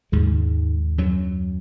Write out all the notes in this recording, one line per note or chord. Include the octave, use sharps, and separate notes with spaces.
D#2 G#2 C#3 G#3
F#2 F#3